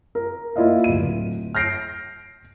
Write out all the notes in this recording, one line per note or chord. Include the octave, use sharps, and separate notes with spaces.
A#4
A#3 E4 F4 D5 D#5 F5
D1 D#7
F6 G6 A#6 C7 D7